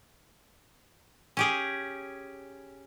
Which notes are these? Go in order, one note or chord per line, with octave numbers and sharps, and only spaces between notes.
C#4 G4 G#4